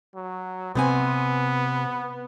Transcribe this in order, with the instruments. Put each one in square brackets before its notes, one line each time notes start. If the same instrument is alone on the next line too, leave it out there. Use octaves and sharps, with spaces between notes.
[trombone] F#3
[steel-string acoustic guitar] C3 C4 G#5 [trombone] B3